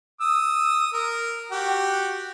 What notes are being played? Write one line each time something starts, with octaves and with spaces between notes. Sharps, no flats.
D#6 E6
A#4
F#4 G4